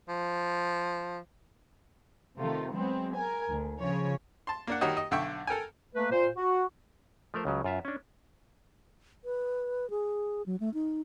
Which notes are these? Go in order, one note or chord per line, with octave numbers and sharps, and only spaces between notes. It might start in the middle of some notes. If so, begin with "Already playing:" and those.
F3
C3 D#3 A3 F4
F#3 G#3 B3 C4
A#4 G#5
D2
C#3 F3 C#5
A5 C6
A#3 D4 F#5
D#3 G3 F#4 C#5 D#5
D#5
B1 D3 E5 G5 C#6
A4 A#4 G5 G#5
A3 A#3 B4
A#2 F4 C5
F#4
F3 A3 A#4 C5
C#2 C#3 F#3
F#2 F4 E5
C#4 D4
B4
G#4
F#3
A3
D#4